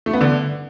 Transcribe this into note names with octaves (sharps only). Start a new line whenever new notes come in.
A3
B3
D3